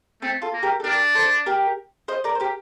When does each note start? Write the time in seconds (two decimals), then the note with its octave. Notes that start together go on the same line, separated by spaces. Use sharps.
0.22 A3 C4
0.42 F4 A4
0.53 A#3
0.63 G4 A#4
0.80 A4
0.84 D4 G4 A#4
1.15 A4 C5
1.46 G4 A#4
2.08 C5 D#5
2.24 A#4 D5
2.35 C5
2.40 G4 A#4